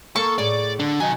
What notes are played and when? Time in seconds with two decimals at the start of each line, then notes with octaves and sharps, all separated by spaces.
0.16 A#3 A4 C#6
0.38 A2 G#4 C#5 D5
0.79 D3 D4
1.00 C3 D#3 F#3 G#5